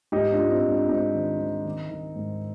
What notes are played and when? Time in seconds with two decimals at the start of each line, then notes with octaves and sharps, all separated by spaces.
0.12 G#2 D#4 G4
0.31 D4 F4
0.38 G#2
0.51 C4 D#4
0.64 G#2
0.70 D4
0.89 G#2 C4 D#4
1.15 D#3
1.40 D#3
1.66 D#3
1.90 D#3
2.16 G#2